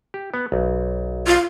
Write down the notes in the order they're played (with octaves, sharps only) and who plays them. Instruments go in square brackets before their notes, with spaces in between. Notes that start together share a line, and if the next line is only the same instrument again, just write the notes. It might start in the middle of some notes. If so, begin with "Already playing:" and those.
[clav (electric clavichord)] G4
B3
B1
[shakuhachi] F4